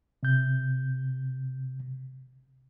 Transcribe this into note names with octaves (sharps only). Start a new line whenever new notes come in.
C3 G6